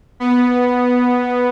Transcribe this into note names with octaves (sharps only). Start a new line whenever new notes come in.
B3